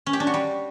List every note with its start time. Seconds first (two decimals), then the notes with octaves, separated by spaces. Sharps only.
0.06 C#4
0.13 G4
0.20 D4
0.27 F#4
0.34 G3